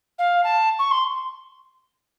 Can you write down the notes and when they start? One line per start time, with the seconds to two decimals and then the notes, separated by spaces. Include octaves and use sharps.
0.18 F5
0.43 A5
0.79 C#6
0.91 C6